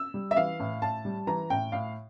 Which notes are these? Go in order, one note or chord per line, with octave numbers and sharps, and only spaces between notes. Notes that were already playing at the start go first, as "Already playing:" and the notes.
Already playing: E6
G3
E5
E3 F5
A2
A2 A5
G3
E3 A#5
A2 G5
A2 F5